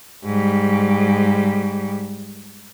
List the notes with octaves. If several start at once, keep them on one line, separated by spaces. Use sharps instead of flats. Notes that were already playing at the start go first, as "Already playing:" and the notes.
G#2 G3